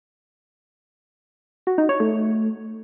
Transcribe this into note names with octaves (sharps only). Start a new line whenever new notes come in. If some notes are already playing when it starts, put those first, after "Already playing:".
F#4
D#4
C#5
A3